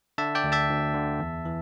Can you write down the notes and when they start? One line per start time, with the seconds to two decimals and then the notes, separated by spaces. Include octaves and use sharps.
0.18 D3 E5 A5
0.35 D5 G5
0.44 D2
0.52 E5 A5
0.69 D2
0.94 D3
1.20 E2
1.45 E3